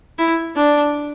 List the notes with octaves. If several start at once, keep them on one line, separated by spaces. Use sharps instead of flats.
E4
D4